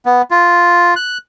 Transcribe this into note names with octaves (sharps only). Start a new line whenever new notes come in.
B3
F4
F#6